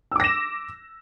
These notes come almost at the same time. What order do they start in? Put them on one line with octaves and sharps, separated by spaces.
E6 D6 A#6 E7